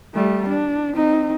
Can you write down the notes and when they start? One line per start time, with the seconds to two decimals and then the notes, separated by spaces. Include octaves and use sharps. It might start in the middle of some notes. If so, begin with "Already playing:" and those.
0.14 G3 A3
0.48 D4
0.93 C4 D#4